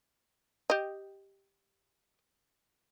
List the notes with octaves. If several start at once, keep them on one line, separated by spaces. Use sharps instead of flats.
G4 D#5